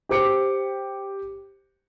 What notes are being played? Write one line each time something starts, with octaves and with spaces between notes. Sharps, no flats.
G4 C5 D6 C#7